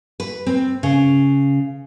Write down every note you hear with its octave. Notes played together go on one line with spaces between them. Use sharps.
B4
C4
C#3